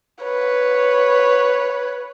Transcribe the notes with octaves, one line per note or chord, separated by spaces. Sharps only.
B4 C#5